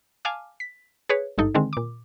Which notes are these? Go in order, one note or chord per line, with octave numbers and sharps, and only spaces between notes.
F5 G#5 A5 D6 F6
B6
G#4 B4 C#5
G#1 G2 D#4 A4
D3 D#3 G#3 C4
A#2 D6